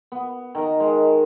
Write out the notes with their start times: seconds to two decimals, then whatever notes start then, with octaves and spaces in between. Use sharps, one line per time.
0.12 B3
0.55 D#3 A#4 A#5
0.80 G#3